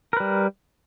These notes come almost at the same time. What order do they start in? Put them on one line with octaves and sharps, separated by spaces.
A#4 B4 G3